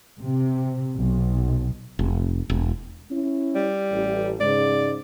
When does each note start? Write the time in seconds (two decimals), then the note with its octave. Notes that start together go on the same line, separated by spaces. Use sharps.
0.21 C3
0.99 B1
1.99 F1
2.50 E1
3.11 C#4 E4
3.55 G3
3.90 A1
4.40 G#2 C#3 D5